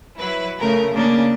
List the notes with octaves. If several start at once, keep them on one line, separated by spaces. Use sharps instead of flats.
F#3 E4 B4
C#3 A3 A#4
C#3 A#3 D4